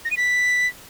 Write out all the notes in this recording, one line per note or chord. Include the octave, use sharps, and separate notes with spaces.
A#6
D#7
B6